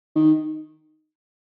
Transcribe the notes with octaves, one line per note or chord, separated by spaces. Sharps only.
D#3